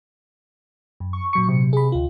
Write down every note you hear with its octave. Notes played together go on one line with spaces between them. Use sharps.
F#2
C#6
A#2 F#3 C#6 C#7
C3
G#4 B5
D2 F4